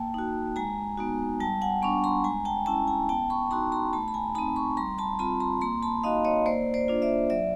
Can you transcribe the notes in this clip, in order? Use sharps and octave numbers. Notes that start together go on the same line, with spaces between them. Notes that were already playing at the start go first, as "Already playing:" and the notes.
Already playing: A#3 G5 A5
D#4 F#4
G#3 G#5 A#5
B3 D#4 F#4
G3 G5 A5
F#5 G#5
B3 D4 B5 C#6
A#5 C6
G#3 G#5 A#5
G5 A5
C#4 E4 G5 A5
G#5 A#5
B3 G5 A5
B5 C#6
D#4 F#4 A#5 C6
A#5 C6
A3 A5 B5
B5
G#5 A#5
C4 D#4 A5 B5
B5 C#6
G3 A#5 C6
A5 B5
C4 F4 A5 B5
A#5 C6
A#3 A#5 C6
A5 B5
D#4 F#4 D#5 F5
C#5 D#5
A#3 C5 D5
C5 D5
D4 F4
D5 E5
F#3 D5 E5